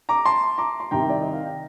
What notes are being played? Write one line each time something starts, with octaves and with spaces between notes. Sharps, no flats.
A#5 D6
A5 C6
A#5 D6
C6
C2 C3 D#3 G5 A#5
D5
D#5
F5
G5